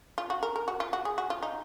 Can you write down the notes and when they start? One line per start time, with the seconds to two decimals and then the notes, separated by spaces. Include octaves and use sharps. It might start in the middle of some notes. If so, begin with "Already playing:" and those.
0.18 F4
0.30 F#4
0.43 A#4
0.56 A#4
0.68 F#4
0.80 F4
0.93 F#4
1.05 G#4
1.18 F#4
1.30 F4
1.43 D#4